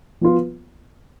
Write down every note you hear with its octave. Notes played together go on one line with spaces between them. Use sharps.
F3 B3 F4